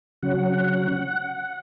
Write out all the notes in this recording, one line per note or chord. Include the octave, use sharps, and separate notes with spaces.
C#3 F#3 C#4 F#5